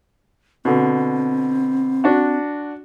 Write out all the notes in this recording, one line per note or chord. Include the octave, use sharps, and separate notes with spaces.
B2 D3 C4
D4 F#4